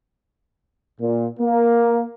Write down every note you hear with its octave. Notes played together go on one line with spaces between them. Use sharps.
A#2
A#3